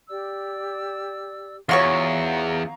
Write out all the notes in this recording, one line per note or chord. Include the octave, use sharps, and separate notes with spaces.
G4 D5 E6
E2 F4 F#4 C#5 F5 A#5 C#6